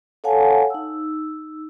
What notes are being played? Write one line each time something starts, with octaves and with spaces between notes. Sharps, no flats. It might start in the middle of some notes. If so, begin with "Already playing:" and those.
A4 C#5 F5 F#5 G#5 A5
D#4 E6